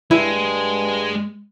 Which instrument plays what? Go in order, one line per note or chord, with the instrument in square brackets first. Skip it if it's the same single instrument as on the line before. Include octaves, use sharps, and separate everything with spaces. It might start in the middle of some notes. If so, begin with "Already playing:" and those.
[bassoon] G2 [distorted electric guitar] G#3 [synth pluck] E4